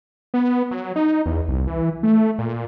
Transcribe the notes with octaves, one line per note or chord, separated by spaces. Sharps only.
B3
F#3
D#4
E2
C2
E3
A3
A#2